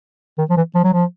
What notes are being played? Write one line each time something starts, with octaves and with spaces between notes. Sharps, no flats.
D#3
F3
E3
F3
F#3
F3